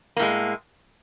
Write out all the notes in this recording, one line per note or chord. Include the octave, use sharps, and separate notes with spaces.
A2 G#3 A#3